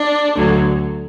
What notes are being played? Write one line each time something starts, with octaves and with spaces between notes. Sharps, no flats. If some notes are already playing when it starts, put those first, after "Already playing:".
Already playing: D4
D2 D3 F#3